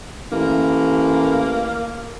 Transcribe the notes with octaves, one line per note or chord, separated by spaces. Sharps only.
A1 A#3